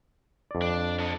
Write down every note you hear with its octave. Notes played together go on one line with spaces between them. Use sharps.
F2 D5
D4
D4 A4 D#5